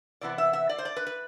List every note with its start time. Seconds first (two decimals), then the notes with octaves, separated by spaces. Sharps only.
0.21 C3 E3 B3 E4 D5
0.38 E5
0.53 E5
0.69 D5
0.78 C5
0.85 D5
0.96 B4
1.07 B4